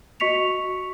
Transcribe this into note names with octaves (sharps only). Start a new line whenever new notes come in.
F#4 D#5 C#6 B6 C#7 F7